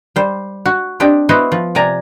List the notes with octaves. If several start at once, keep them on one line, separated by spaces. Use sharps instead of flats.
G3 C5
F#4
C4 D4 G4 D#5
B3 E4 F#4 C5 D#5
F3
C3 D5 G#5 A#5